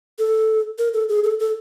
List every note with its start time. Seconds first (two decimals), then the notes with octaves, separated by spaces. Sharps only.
0.19 A4
0.78 A#4
0.94 A4
1.09 G#4
1.24 A4
1.40 A4